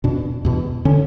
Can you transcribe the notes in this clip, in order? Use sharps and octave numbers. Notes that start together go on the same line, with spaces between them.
E2 B2 D4
E2 B2
D3 C#4